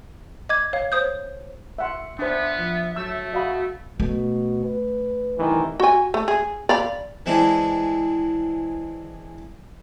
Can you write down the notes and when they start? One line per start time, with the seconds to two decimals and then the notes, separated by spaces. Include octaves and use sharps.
0.49 D#5 D6 G#6
0.73 C#5 F5
0.92 C5 C#5 D#6 G6
1.78 E5 F#5 C6
2.19 B3 D4 C5 E5
2.58 F3
2.96 F#3 A3 E6
3.34 F#4 D#5 F5 B5
4.00 B2 A3
4.65 B4
5.39 C2 D#3 E3
5.80 F#4 G#5
6.14 A3
6.28 G#4
6.69 D5 F5 B5
7.26 E3 G#3 C4 D4 E4